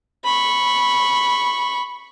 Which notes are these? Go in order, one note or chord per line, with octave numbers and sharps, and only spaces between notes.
B5 C#6